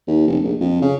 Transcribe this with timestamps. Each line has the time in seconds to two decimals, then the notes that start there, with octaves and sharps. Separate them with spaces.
0.07 D#2
0.28 F1
0.44 A#1
0.60 F2
0.82 C#3